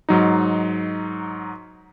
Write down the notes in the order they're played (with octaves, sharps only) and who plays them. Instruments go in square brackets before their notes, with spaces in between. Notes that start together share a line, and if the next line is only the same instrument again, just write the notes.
[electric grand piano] G#2 F#3 D#4